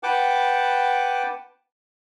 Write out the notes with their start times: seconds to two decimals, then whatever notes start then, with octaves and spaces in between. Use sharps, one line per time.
0.03 B4 F#5 G5 A5 D6